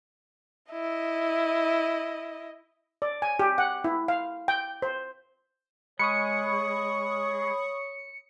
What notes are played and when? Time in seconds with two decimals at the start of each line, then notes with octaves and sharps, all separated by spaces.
0.72 E4 D#5
3.02 D5
3.22 G#5
3.39 G4
3.58 F#5
3.84 E4
4.08 F5
4.48 G5
4.82 C5
5.99 G#3 C#5 B5 C#6 D#6 C#7